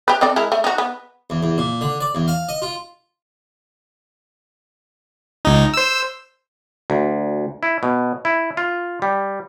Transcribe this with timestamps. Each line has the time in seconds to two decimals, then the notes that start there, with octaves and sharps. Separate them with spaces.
0.08 G4 B4
0.21 C4 A4 D5
0.36 G#3 E4 A#4
0.52 A3
0.64 D#4 F#4
0.78 B3
1.30 E2
1.43 E2
1.58 A#2
1.81 D3
2.01 D5
2.15 E2
2.28 F5
2.49 D#5
2.62 F4
5.45 C#2 D#4
5.74 C5 E6
6.90 D2
7.63 E4
7.83 B2
8.25 E4
8.57 F4
9.02 G3